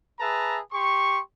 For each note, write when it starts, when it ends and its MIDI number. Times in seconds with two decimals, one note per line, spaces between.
0.20 0.59 68
0.20 0.59 71
0.20 0.59 76
0.20 0.59 81
0.20 0.59 82
0.72 1.19 67
0.72 1.19 84
0.72 1.19 85